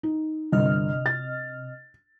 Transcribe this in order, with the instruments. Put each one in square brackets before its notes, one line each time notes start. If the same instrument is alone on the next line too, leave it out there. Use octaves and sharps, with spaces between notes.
[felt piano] D#4
[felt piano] G1 [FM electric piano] C3 D#5 F6
[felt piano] A6